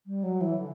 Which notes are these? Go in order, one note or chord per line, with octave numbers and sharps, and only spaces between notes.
G3
F#3
E3
D3